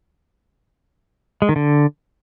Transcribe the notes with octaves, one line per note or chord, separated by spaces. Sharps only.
G#3
D#3
D3